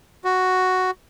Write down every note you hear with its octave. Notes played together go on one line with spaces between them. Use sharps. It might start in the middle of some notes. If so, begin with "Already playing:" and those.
F#4